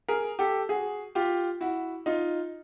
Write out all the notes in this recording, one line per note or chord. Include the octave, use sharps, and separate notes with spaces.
G#4 A#4
G4 A4
F#4 G#4
F4 G4
E4 F#4
D#4 F4